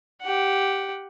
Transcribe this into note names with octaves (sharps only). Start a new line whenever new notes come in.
G4 F#5